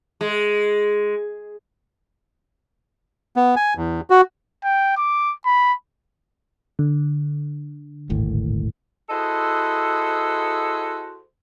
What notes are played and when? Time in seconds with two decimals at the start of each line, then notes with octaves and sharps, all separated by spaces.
0.21 G#3
3.36 B3
3.56 G#5
3.77 E2
4.10 F#4
4.64 G5
4.97 D6
5.46 B5
6.79 D3
8.09 D#1 G#1 A2
9.10 E4 F#4 G#4 A4 C5 D#5